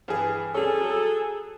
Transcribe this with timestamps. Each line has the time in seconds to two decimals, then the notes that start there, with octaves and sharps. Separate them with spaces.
0.08 G2 E3 G#4
0.54 G3 C#4 G#4 A4
0.81 F#3